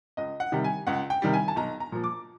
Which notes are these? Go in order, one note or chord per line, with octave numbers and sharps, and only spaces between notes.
C#2 D#5
F#5
C3 D#3 G3
G#5
C#2 F#5
G5
C3 D#3 G3
G#5
A5
B1 A#5
A#5
A#2 F3
D6